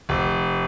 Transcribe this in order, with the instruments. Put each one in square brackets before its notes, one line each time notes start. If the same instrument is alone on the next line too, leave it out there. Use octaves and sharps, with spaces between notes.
[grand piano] F1